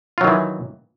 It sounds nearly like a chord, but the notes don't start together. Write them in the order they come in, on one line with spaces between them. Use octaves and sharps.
F4 F#3 D#3 E3